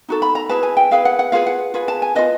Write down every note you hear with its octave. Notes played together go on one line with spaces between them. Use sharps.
D#4 F#4 A4
B5
A#5
E4 G#4 B4 A5
G#5
G5
E4 G#4 B4 F5
F#5
F#5
F4 G#4 B4 F5
F#5
F4 G#4 B4
A5
G#5
F4 G#4 B4 D#5